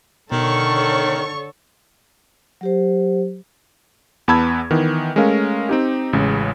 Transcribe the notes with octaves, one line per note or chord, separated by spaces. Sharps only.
B2 D3 D#3 A4 C#5 C#6 F6
F#3 G4 C5
E2 B3 A5 B5 E6 G#6
D#3 E3 B3
G#3 A3 C#4 A#4 F5
C4 D#4 G4
A1 C#3 G#3